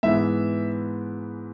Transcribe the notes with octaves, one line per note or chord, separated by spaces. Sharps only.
G#2 E3 B3 E5